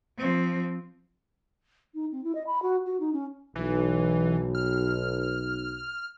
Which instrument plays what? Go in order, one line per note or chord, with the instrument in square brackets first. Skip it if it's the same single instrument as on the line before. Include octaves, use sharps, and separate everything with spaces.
[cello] F3 C4
[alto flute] D#4
C4
E4
D#5
B5
F#4
F#4
D#4
C#4
[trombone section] B1 [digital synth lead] E3
[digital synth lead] F6